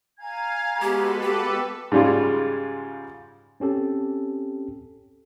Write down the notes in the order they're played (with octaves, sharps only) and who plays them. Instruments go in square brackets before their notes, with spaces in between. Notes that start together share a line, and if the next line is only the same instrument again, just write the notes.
[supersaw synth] F5 [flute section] G#5 A#5 G#6
[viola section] G#3 B3 F#4 [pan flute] G4 [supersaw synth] A4 B4
[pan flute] G4 [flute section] G5 D6
[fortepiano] G#2 C#3 G3 G#3 F4
[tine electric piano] C4 C#4 G4 A4